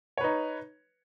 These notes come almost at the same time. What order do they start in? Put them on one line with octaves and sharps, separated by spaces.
C#5 B4 D#4